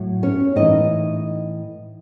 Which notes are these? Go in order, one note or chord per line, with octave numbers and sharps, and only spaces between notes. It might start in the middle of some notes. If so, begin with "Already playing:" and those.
Already playing: A2 F#3
C#4 C#5
A2 E3 D#4 D#5